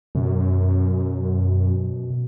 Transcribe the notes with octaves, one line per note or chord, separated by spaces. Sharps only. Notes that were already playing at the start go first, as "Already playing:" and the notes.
F#2 B2